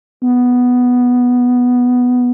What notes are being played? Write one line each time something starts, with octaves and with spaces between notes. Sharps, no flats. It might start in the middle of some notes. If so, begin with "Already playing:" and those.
B3